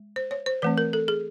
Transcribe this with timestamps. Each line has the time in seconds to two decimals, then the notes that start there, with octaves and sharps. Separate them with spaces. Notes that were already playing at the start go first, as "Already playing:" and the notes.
Already playing: G#3
0.16 C5
0.31 C#5
0.46 C5
0.62 E3 A3 C4 B4
0.78 A#4
0.93 A4
1.08 G#4